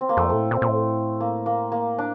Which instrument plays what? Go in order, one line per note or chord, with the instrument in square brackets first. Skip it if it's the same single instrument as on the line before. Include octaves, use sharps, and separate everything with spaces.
[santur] C4
A#3
[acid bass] F2 [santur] A3
[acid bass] A2 [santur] A3
[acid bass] A#2
[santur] C4
[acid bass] A#2
A2
[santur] A#3
A#3
A#3
D4